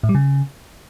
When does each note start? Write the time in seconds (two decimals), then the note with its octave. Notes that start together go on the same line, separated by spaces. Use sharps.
0.03 A2
0.09 G3
0.15 C#3